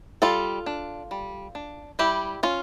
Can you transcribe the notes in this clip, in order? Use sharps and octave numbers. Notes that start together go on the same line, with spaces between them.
G3 F4 A4
D4
G3
D4
G3 E4 G4
C#4 F4